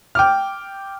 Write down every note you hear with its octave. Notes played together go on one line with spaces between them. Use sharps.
G5 D6 F6